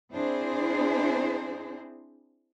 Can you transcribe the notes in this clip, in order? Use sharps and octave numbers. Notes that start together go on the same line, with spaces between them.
C4 D4 E4 G#4 C5